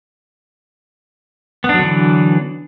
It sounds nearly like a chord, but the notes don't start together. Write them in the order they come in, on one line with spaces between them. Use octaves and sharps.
B3 D4 F#3 D3 E3